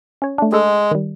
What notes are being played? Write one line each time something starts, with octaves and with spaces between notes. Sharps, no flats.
C#4 C#5
A3 D4
G#3 G#4 A4
D#3 G3